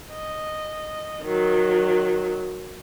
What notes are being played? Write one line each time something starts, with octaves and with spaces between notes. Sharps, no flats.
D#5
D#3 F#3